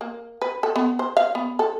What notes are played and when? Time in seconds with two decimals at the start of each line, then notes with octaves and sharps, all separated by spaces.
0.01 A#3
0.42 B4
0.63 A4
0.76 B3
0.99 C5
1.17 F5
1.35 B3
1.59 A4